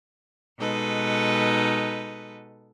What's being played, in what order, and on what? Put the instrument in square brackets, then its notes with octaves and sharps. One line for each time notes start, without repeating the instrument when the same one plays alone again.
[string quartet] B2 G#3 D#4 A4 B4